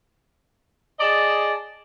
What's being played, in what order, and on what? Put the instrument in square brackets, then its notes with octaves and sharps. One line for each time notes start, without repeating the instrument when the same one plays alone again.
[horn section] G#4 D5 D#5 A5